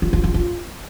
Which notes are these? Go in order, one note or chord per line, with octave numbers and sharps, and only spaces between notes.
F4
F4
F4
F4